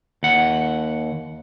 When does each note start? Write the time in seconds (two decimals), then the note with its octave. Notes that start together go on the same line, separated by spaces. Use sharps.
0.23 D#2 F#5